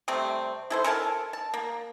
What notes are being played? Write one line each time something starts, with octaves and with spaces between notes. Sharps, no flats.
C3 G3 A3 C4
E4 A4 C5
A4 A#4 G#5 A5
A5
A#3